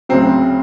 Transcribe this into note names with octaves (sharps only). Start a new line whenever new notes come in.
D2 C#3 F#3 C4